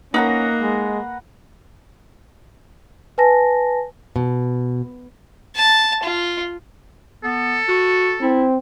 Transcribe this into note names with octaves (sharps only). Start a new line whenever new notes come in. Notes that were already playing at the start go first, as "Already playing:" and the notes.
A#3 C#4 D#4 B4 F#5 A#5
G#3
B4 G#5 A5 A#6
B2
A5
F4
B3 A4
F#4
C4 E4